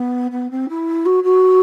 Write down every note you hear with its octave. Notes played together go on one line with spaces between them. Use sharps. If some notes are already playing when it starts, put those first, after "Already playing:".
Already playing: B3
B3
C4
E4
F#4
F#4